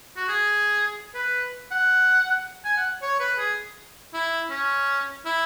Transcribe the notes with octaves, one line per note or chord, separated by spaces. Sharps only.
F#4
G#4
B4
F#5
G#5
F#5
C#5
B4
G#4
E4
C#4
E4